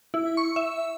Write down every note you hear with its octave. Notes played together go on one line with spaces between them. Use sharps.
E4
C#6
E5